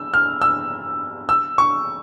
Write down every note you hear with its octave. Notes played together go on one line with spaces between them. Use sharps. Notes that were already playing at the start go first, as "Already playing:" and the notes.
Already playing: E6
F6
E6
E6
C#6